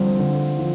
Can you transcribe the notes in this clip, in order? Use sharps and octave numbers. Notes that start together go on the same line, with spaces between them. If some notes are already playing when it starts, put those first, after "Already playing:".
Already playing: D3 F3 G3 C4
D3
F3